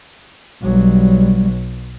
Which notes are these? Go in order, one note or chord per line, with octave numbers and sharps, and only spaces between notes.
B1 F#3 G3